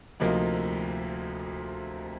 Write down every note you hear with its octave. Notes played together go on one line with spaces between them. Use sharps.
D2 C3 F3 A#3 D#4